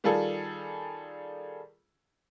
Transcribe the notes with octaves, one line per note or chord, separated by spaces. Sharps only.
D#3 G3 F4 G#4 A4